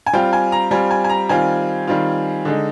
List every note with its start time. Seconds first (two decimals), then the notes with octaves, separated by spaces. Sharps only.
0.06 G#5
0.13 G3 C4 F4 G5
0.33 G#5
0.52 A#5
0.71 G3 C4 F4 G#5
0.91 G#5
1.04 G#5
1.09 A#5
1.29 D#3 G3 C4 F4 G#5
1.87 D#3 G3 C4 F4
2.45 D3 G#3 D#4